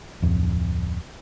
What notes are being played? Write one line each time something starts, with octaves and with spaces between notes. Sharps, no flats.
D1 F2